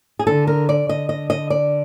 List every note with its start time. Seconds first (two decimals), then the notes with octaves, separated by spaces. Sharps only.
0.19 G#4
0.27 D3 A4
0.47 A#4
0.69 D5
0.88 D3 D#5
1.09 D#5
1.30 D#5
1.50 D5